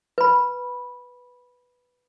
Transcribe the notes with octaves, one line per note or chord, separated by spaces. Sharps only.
B4 B5